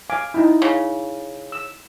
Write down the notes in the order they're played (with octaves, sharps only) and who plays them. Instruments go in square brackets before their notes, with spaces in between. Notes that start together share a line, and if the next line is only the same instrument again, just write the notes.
[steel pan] F5 G#5 D6
D#4 E4
[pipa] C#3
[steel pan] E6